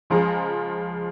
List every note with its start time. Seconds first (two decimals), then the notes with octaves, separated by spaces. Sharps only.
0.10 C#2 F3 G#3 A#5